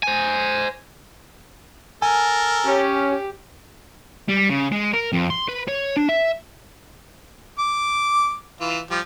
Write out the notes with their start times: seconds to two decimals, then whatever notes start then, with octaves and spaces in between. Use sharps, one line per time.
0.03 C5 G#5
2.02 A4 A#4 G#5
2.66 C#4 G4
4.29 G3
4.50 C#3
4.72 G#3
4.93 A#4
5.12 F2
5.30 C6
5.48 B4
5.68 C#5
5.97 D4
6.09 E5
7.59 D6
8.60 E3 F4
8.90 F3 G3